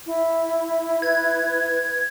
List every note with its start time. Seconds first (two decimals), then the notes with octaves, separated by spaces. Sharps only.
0.06 E4
1.02 B4 G#6